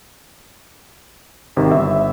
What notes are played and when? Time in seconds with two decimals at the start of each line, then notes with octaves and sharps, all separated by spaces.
1.56 G#1 C3 D#3
1.72 G1 E5